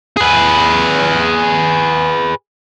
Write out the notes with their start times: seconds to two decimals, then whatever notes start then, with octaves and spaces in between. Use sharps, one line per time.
0.17 G#4 B4